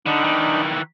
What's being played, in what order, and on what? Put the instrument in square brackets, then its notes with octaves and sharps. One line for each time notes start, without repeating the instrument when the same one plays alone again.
[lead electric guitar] D3 [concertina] D4 D#4 B5
[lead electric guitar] D#3 E3